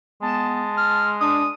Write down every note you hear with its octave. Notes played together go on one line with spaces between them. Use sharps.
G#3 B3 A5
F6
D4 D#6